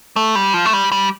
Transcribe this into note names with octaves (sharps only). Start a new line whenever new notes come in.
A3
G3
F3
A3
G3
G3